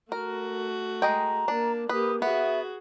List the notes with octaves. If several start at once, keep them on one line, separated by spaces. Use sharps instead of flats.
A3 F#4 A#4
G#3 D#5 G5 A#5
A#3 D4
A#3 G4 B4 D#6
B3 F#4 G#4 E5